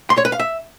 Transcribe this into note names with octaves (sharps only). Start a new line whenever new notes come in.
C6
C#5
B4
F5
E5